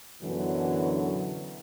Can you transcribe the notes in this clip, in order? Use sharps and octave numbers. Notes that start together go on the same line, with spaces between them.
F#2 B2 D3 E3 F#3